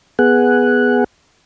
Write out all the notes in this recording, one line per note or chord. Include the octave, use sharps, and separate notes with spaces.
B3 G#4 F#5